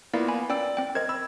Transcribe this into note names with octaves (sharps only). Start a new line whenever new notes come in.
A#3 B3 E4 F4 D5 F5
G#5 B5
C#4 D5 G5 E6
C4 G5
A#4 C5 D#5 G#6
B5 E6